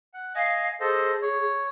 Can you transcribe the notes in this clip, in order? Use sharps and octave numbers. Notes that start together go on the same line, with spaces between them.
F#5
D#5 F5 G#5
G#4 A4 C5 D#5
C#5